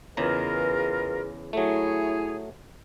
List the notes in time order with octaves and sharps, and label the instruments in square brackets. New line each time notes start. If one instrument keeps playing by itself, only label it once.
[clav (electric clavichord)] E2 C#3 A#5 [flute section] F4 A#4 D#5 [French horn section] G#4 B4
[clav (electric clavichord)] F#3 A3 [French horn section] E4 [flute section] G#4 C#5